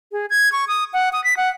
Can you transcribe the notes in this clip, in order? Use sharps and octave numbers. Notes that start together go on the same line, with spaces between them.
G#4
G#6
C#6
D#6
F#5
D#6
B6
F#5